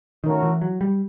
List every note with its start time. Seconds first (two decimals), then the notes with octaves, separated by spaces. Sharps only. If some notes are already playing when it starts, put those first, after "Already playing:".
0.23 D#3 A3 C#4 F#4 A#4
0.43 E3
0.62 F#3
0.81 G3